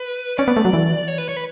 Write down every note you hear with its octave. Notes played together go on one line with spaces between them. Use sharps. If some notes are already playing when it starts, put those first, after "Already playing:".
Already playing: B4
C#4 D5
B3
A3
F#3
E3
C#5
B4
C#5
B4